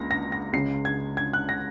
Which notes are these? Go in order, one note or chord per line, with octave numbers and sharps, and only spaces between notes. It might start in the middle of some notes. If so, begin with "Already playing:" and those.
Already playing: C#2 A#3 A#6
A#6
A#6
C#2 C#3 G#3 C7
G#6
G#6
F#6
A#6